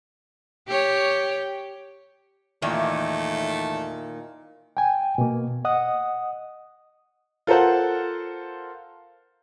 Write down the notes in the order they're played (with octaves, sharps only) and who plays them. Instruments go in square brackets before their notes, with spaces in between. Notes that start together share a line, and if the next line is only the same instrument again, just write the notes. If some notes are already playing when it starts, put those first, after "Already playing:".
[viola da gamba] G4 C#5
[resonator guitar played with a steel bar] E2 [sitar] A#2 D#3 [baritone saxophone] A3
[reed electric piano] G5 G#5
B2 A#3
D#5 F#5 D#6
[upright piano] F4 A4 A#4 C5 F#5